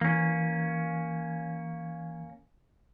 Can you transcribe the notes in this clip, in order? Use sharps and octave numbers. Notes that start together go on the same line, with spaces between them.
E3 A#3 C#4